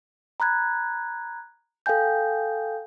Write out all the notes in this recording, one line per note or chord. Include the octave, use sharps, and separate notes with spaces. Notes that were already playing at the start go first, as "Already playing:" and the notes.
A#5 B5 F#6 G#6
A4 F5 G5 G#5 G6